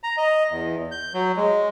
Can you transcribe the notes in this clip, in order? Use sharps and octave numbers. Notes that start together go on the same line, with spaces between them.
A#5
D#5
E2
G6
F#3
G#3